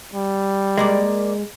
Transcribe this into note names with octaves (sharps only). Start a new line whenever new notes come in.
G3
G#3 A#3 A#4 D5